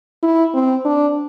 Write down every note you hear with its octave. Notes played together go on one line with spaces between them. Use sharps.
E4
C4
D4